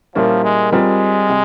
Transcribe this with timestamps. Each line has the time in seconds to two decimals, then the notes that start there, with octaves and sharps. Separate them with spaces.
0.15 A#2 F3 G3 A#3 C#4 E4
0.44 G#3
0.72 G3 G#3 C4 F4 A#4
1.29 C3 G3